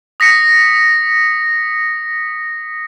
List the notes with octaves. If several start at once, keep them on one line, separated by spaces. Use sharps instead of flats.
D#6 A#6 B6 C#7